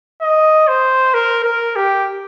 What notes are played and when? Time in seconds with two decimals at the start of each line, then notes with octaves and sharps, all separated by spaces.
0.22 D#5
0.67 C5
1.14 A#4
1.44 A#4
1.76 G4